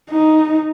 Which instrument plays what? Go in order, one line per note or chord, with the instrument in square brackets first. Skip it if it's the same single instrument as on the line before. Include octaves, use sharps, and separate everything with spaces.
[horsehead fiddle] D#4